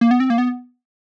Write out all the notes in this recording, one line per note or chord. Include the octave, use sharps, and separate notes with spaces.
A#3
B3
C4
A#3
B3